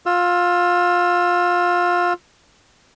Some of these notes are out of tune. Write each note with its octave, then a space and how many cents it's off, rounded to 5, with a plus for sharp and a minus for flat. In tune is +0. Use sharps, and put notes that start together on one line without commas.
F4 +20 E6 +25